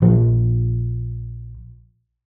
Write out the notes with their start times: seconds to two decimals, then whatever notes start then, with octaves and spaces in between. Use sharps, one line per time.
0.02 A#1 F3